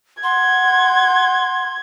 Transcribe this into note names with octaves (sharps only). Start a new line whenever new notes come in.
F#5 C6 G#6